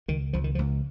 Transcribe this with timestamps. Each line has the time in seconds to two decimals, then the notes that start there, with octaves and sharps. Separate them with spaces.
0.08 C#2 D#3
0.33 C#2 F3
0.44 D#3
0.55 F3
0.59 C#2